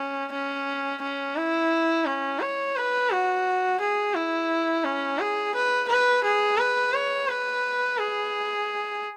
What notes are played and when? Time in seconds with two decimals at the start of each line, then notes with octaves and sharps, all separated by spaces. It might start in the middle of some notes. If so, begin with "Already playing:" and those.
Already playing: C#4
0.33 C#4
1.02 C#4
1.36 E4
2.06 C#4
2.41 C#5
2.77 B4
3.11 F#4
3.80 G#4
4.15 E4
4.84 C#4
5.19 G#4
5.55 B4
5.89 B4
6.24 G#4
6.58 B4
6.93 C#5
7.28 B4
7.98 G#4